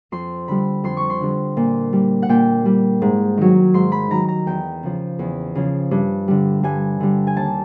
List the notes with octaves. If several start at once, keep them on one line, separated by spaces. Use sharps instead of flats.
F2 C6
D3 G3 B5
F2 C6
C#6
C6
D3 G3
A#2
G3
F#5
A#2 G5
G3
G#2
D#3 F#3
G#2 C6
B5
D#3 F#3 A#5
A#5
E2 G5
C#3 F3
E2
C#3 F3
G2
D3 G3
G2 G#5
D3 G3
G#5
D#2 A5